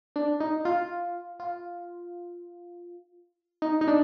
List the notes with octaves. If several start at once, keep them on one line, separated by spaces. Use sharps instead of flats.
D4
D#4
F4
F4
D#4
D#4
D4